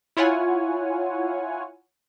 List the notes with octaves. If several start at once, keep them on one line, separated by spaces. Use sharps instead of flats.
E4 F4 C#5 F#5 G#5